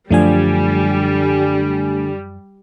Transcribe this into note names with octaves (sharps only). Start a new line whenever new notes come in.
F#2 D3 F3 G3 A3 D4 G#5